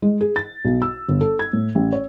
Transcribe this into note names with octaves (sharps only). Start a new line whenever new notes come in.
G#3
G#4
A6
B1
E6
G1
A4
G#6
A2
A1
C#5